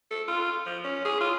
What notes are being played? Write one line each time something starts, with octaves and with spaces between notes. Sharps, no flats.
A4
F4
F3
C#4
G#4
F4